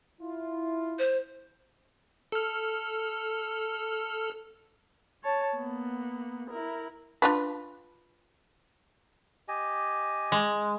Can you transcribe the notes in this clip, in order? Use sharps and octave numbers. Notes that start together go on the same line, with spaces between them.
E4 F4
C5
A4 F6
C#5 A5
A#3 B3
E4 A#4
D4 F4 B4
G4 D#5 G#5
G#3